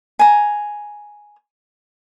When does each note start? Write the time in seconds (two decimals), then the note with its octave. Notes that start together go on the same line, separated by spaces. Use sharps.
0.19 G#5 A#5